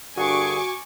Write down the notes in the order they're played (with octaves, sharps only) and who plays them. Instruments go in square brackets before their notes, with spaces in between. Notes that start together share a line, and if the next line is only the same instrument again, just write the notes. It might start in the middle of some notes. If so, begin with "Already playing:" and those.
[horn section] G2 D3 G#4 [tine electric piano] F#4 [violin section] G#5 C#6 D6